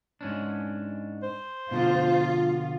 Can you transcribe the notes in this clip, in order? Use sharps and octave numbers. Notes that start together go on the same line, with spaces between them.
G#2 C#4 D4
C5
B2 D3 F3 F4